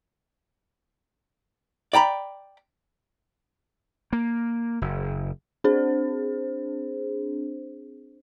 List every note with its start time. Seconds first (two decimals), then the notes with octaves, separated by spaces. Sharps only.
1.93 D5 G5 A#5 B5
4.13 A#3
4.82 F#1
5.64 C4 D4 G#4 C5